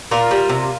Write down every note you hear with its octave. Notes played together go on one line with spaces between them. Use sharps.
A#2 F4 A#4
G3
C3